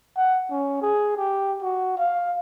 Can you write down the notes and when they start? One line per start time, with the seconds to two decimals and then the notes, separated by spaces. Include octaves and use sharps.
0.17 F#5
0.51 C#4
0.82 G#4
1.17 G4
1.62 F#4
1.97 F5